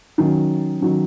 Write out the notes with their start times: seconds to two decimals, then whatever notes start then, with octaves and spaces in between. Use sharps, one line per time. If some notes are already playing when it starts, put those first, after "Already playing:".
0.18 D#3 F#3 C#4
0.81 D#3 F#3 C#4